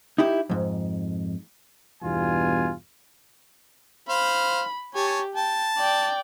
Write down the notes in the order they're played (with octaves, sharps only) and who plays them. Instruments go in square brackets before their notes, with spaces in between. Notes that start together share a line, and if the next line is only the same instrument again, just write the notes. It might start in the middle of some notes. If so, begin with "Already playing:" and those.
[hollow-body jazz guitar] D#4 E4 G4
F2 G#2
[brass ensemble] E2 G2 B2 F4 G#5
[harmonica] C5 F5 [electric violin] B5
[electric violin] G4 [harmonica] C#5 G#5 A5
[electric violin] G5 [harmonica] A5
[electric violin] D5 G5